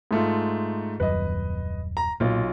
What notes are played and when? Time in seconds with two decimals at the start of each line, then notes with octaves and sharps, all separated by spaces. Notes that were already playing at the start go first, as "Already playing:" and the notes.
0.11 G#2 A3 F4
1.00 D#1 F#2 B4 D#5
1.97 A#5
2.20 B1 A#2 F4